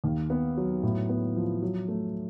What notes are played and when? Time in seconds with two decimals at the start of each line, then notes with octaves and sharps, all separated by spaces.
0.04 D#2
0.30 B3
0.57 F#3
0.83 A2
1.09 B3
1.36 F3
1.62 F#3
1.88 A3